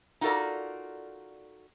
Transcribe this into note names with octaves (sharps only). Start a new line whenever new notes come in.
D#4 F4 F#4 A4 A#4 D5